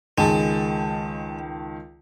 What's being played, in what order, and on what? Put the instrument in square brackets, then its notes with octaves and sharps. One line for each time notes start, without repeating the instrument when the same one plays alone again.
[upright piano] C#2 D#3 A5 [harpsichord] G#3